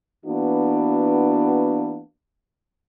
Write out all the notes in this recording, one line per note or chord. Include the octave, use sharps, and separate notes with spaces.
E3 A#3 B3 D4 F#4